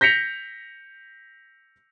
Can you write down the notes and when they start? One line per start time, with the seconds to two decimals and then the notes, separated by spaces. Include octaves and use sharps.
0.01 G6 A#6 B6 C#7 F7